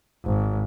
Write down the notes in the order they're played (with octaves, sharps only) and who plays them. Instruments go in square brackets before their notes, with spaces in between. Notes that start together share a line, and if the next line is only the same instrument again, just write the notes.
[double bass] G#1